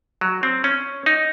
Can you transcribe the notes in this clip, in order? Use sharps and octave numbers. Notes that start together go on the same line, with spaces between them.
F#3
C4
C#4
D#4